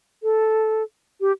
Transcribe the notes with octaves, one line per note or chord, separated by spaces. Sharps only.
A4
G4